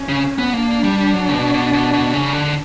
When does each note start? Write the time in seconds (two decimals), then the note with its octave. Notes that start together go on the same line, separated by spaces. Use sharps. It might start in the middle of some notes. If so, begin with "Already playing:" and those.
Already playing: C#4
0.09 C#3
0.38 B3
0.53 A#3 D4
0.84 G3
1.13 F#3
1.29 C#3
1.33 B2
1.54 B2
1.73 B2
1.93 B2
2.13 C#3
2.33 D3